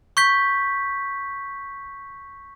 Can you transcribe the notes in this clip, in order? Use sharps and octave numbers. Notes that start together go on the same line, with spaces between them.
C#6 G6 B6